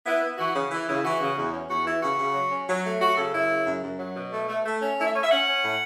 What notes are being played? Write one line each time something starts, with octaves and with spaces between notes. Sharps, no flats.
B3 E4
B3
E3 F#4
C#3
E3
C#3 E4
E3 F#4
C#3
E2
C#4
E2 F#4
E3 E4
C#3 F#4
C#3
F#3
C#4
F#3
A3
F#3 F#4
C#3 A4
F#2 E4
C#3
F#2
F#2
F#3
B2
A3
A3
A3
C#4
A3 E4
E5
C#4 C#5
E5
C#4 F#5
C#4
A2